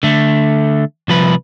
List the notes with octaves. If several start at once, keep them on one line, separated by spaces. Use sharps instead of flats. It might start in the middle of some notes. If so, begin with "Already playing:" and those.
D3 A3
C2 F3 B4